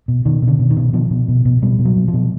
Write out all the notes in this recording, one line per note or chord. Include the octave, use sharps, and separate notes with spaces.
B2
B2 D#3
B2
D3
B2
D#3
B2
B2 F3
B2
B2
B2
B2 G3
B2
F#3
B2
F3
B2